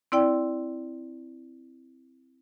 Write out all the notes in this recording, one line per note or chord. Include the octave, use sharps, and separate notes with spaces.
C4 E4 D5 G5